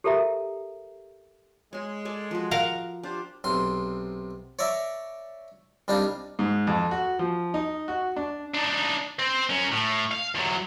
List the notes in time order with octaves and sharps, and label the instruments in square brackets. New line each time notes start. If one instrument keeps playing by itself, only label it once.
[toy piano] G4 A4 A#4 E5 A#5
[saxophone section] G#3 [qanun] C#5 C6
[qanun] A4 D5 G#5
F3 F#4
[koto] A#4 F5 F#5
[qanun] D4 [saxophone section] F4 G4 C5
[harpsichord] B1 C3 C6
C#5 D5 E5 A#5
C2 G3 D4 D#4 F5
[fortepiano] G#2
F2
F#4
F3
D#4
F#4
D4
[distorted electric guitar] D4 D#4
C4
C#4 A#4
A2
F5
E2 F#3